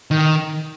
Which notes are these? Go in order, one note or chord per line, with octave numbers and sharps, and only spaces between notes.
D#3